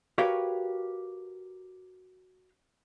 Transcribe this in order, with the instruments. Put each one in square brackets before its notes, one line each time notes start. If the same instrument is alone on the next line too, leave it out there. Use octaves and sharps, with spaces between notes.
[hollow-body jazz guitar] F#4 G4 A#4 B4 C#5 F5